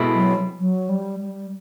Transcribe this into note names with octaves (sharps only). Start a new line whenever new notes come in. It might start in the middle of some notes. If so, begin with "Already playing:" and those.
Already playing: B2 G#3 C4 E4 A4
F#3
F#3
G3
G3